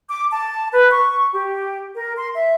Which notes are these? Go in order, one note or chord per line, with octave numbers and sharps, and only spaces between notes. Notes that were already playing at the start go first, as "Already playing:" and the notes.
D6
A5
B4
C#6
G4
A#4
C6
E5